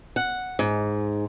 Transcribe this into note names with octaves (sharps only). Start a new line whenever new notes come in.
F#5
G#2